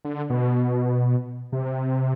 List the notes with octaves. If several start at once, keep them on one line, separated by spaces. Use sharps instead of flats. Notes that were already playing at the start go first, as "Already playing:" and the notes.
D3
B2
C3